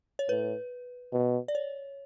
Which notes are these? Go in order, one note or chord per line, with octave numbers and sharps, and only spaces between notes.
C#5
A2 B4
B2
D5
C#5